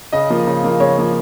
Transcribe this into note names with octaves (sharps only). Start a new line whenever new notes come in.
C#3 D#5
F3 A#3
C#3
F3 A#3
C#3 C#5
F3 A#3